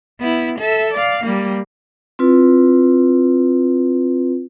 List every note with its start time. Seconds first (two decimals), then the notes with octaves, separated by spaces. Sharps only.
0.19 B3 E4
0.59 A4 E5
0.93 D5 F5
1.24 G3 A#3
2.19 C4 E4 F4 B4